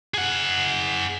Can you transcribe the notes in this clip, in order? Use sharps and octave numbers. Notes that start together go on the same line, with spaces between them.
G#4 F#5